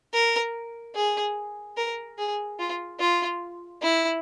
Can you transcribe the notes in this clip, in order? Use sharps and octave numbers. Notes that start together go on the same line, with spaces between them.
A#4
G#4
A#4
G#4
F4
F4
E4